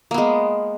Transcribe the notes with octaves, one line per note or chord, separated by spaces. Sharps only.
G#3 A#3 B3